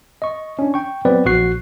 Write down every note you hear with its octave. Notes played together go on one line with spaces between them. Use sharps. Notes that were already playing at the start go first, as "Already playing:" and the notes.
D#5 C#6
C#4 D4
G5 C#6
F#3 B3 C4 B4 D5
A#1 F#4 C#6 F#6 C7